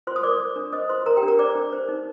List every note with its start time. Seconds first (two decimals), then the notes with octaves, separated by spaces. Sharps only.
0.07 F4 C5 C6
0.16 D#6
0.23 A#4 D5 D6
0.40 C5
0.56 D4
0.73 C5 D#5 D#6
0.89 F4 C5 C6
1.06 A#4 A#5
1.17 G4 G5
1.23 D4
1.28 A#4 A#5
1.39 C5 D5 D6
1.55 D4
1.73 C5
1.88 D#4